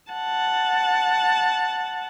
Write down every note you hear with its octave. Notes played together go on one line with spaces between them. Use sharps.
F#5 A5